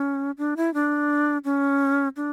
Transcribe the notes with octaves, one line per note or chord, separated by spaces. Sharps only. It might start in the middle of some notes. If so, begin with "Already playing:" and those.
Already playing: C#4
D4
E4
D4
C#4
D4